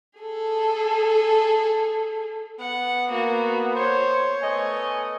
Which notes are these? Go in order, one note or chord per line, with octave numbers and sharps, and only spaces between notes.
G#4 A4
B3 F#5
A#3 F#4
C5 C#5
A3 B3 D#5 G#5